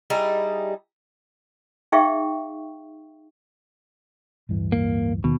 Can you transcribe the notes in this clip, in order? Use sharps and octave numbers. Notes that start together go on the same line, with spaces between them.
G3 D#4 E4 G#4
D#4 G#4 E5 F5 G5 C#6
D1 G2 E3
A#3
D#2 B2 D#3